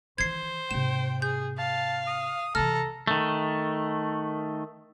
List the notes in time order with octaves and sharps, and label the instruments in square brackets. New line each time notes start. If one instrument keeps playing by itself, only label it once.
[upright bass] D#3 E3 [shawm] C5 [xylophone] G#6 C7
[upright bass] G#2 C3 [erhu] G5 [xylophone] E7
[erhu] G#4 [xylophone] G6
[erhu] F5 [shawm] A5
[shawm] D#6
[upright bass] C3 E3 [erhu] A4 [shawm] A#5 [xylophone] F6
[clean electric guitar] D#3 A3